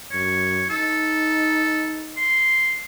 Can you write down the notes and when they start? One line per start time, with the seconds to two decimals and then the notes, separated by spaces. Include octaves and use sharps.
0.12 F#2 C#5
0.70 D#4 A4
2.17 C6